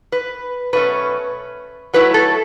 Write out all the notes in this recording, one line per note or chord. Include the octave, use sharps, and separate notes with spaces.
B4
B2 F#3 A3 C#4 B4
F#3 A3 E4 B4
A4